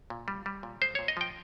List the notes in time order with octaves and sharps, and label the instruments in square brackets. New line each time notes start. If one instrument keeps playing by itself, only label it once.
[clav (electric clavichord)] A#2
G3
G3
A#2
G#3 C5
A#2 C#5
D#5
F3 G5